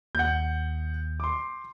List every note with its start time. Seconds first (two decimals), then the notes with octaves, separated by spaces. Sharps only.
0.15 D#2 F#5 G6
1.20 C6 D6